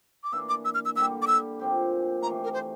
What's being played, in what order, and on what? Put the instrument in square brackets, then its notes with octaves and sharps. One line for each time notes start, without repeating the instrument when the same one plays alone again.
[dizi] D6
[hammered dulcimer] E3 A#3 D4 [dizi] E6
[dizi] D6
E6
F6
E6
[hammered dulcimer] D3 G3 A#3 [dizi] E6
[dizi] D6
E6
[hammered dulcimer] A#2 F3 C4 G4
[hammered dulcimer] C3 E3 A3 [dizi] A#5
[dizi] A#4
C5